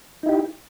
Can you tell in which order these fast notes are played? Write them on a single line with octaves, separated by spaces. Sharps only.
D#4 E4 G4